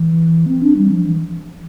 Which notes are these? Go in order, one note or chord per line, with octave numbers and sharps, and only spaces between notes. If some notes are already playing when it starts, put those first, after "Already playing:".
Already playing: E3
C4
D4
G3
F3
E3